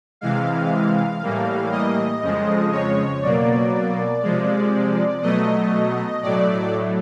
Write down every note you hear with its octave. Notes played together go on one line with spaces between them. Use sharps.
C3 E3 G#3 F5
A2 E3 G3 A#3
D#5
F2 C#3 F3 G#3
C#5
B2 F#3 A#3 D5
C3 F3 G#3
B2 F#3 A3 D#5
A2 F#3 A3 D5